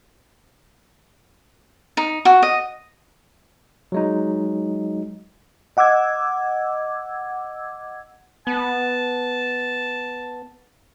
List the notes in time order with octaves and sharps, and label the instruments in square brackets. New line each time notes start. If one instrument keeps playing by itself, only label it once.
[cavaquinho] D#4
F#4
D#5
[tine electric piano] F#3 G#3 D#4
[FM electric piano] D#5 F#5 D6 E6 G#6
[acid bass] B3 [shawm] A5